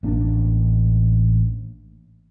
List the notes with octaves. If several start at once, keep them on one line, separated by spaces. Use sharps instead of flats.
A1 A#3 D4